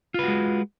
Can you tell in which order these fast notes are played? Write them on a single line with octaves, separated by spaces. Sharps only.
F4 B4 F#4 G#3